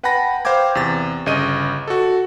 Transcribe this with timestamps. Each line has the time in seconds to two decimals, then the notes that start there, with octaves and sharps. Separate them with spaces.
0.03 B4 F#5 G5 A5 B5 A#6
0.45 C5 F5 G5 D6 G#6
0.75 E2 C3 A6
1.26 G1 C#3 D#5 D#7
1.87 F#4 A4